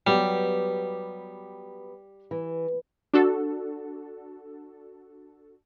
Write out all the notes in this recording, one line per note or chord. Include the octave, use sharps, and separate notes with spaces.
F#3 G3 B3 G4
E3
D4 F#4 A4